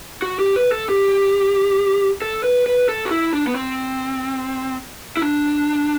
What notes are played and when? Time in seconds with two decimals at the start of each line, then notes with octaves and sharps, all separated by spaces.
0.22 F#4
0.39 G4
0.56 B4
0.72 A4
0.89 G4
2.22 A4
2.44 B4
2.66 B4
2.89 A4
3.05 F#4
3.11 E4
3.33 D4
3.47 B3
3.55 C4
5.17 E4
5.22 D4